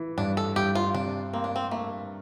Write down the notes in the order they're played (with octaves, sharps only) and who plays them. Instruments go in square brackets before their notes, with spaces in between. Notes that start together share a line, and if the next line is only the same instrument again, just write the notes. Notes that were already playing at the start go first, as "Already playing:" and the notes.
Already playing: [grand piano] E3
[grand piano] G2 [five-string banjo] D4
[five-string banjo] A4
[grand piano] G2 [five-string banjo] G4
[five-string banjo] F4
[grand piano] C3 [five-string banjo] D4
[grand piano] A#3 [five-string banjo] C4
[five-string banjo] D4
C4
[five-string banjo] A3 [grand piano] A#3